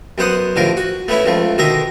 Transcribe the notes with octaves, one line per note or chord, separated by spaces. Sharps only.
F#2 B3 C5 F#5 D#6
A1 D3 F3 A#4
F#4
A3 B3 C#4 E4
C#2 F3 A3
B2 D3 D#3 D#5 E5 A#5